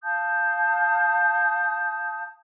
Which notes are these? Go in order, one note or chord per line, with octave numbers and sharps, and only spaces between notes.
F5 A5 D#6 G6